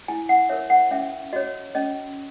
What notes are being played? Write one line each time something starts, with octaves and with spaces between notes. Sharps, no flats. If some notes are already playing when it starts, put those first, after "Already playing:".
E4 G#5
F#5
A#4 C#5 E5
F#5
C#4 E5
F#4 C#5 D#5
C#4 D#5